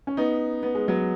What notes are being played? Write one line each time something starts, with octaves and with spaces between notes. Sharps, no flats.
C#4
B3 D#4
B3
G#3
F#3 B3